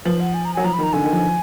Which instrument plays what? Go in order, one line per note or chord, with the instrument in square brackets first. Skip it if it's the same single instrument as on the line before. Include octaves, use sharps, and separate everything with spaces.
[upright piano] F3 [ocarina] B4
[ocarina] F#5
G#5
A#5
[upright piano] F#3 [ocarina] G#5
[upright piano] F3 [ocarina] A#5
[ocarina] B5
[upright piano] D#3
[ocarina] A#5
[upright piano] D3 [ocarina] G#5
[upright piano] D#3
F3